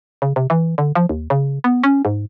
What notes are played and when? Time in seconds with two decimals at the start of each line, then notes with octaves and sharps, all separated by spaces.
0.22 C#3
0.36 C3
0.50 E3
0.78 D3
0.95 F3
1.09 D#2
1.30 C#3
1.64 B3
1.84 C#4
2.05 G#2